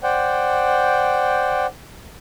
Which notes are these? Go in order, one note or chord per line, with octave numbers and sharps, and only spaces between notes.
C5 D5 F#5 G5